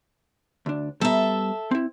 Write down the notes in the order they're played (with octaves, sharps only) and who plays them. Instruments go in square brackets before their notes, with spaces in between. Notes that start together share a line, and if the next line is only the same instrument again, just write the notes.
[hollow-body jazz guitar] D2 D4
[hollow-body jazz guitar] G3 B3 A#5 [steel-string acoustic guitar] A4 E5
[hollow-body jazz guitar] C4 E4